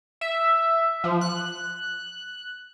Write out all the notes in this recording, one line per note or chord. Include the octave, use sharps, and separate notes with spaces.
E5
F3
F#6